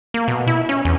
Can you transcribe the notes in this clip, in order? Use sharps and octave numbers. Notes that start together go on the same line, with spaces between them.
A#3
B2
E4
C#4
E2